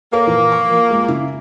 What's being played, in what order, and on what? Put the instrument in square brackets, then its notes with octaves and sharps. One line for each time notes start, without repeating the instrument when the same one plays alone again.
[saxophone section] A#3 [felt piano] A4 A#4 C#5
[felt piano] A#2 E3 F3
C#6
F3
G#3 F4
C#3 E4